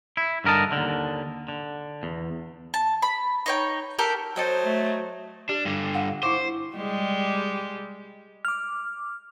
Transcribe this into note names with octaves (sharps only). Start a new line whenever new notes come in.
E4
G2 D3 A#4 D#5 A5
D#2 D3
D3
E2
A5
B5
D#4 C#5 G5
G4 A4 A#4 G5
F#3 A4 C5 D#5 G5
A3
D4 G4
G2 D3
F5 F#5
E4 C5 D6
G3 G#3 G4
D6 F6